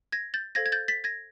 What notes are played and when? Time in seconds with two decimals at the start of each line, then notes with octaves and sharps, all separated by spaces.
0.12 G#6 A#6
0.34 G6 A6
0.55 A4 C5 F5 G#6 A#6
0.66 G#6
0.72 G6 A6
0.88 A6 B6
1.04 G#6 A#6